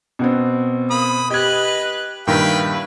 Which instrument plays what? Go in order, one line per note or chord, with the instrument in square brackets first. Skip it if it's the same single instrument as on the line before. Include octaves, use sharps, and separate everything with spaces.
[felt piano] B2 B3 C4
[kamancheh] A#3 [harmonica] B5 D#6
[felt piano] G4 G#6 [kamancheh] B4 F#6 [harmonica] D#5
[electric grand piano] G2 A#2 D#3 [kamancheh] E4 B4 [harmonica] F5 G5